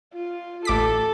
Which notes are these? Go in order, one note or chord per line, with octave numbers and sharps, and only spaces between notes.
F4
A1 A4 D6 B6